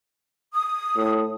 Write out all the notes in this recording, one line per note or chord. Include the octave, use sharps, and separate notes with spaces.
D#6
A2